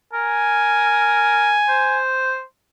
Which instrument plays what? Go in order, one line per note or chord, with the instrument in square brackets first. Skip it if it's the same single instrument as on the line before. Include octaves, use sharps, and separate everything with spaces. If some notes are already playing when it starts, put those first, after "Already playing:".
[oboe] A#4 [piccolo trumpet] G#5
[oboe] C5